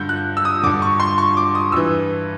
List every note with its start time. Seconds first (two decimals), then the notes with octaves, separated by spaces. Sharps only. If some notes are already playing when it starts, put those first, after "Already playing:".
Already playing: G2 D3 G6
0.09 F#6
0.37 E6
0.45 D#6
0.63 D3 D6
0.67 G2
0.82 C#6
1.00 C6
1.18 C#6
1.37 D6
1.55 D#6
1.72 G2 E3 E6